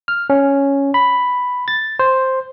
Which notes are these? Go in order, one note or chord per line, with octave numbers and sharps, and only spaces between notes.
F6
C#4
B5
A6
C5